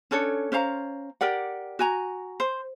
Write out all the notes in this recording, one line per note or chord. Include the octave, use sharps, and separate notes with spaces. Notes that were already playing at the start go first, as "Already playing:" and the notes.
C#4 D4 A4 C#5
C#4 C5 F5 A#5
G4 A#4 D5 F#5
F#4 G#5 A#5
C5